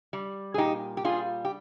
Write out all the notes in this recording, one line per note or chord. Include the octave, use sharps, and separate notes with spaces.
G3
G#4
A#2 D#4 G4
G4
G3 F4 G#4
G4